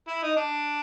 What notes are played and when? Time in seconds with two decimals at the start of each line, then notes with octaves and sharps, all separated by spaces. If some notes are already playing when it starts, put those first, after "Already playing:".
0.08 E4
0.23 D#4
0.36 D4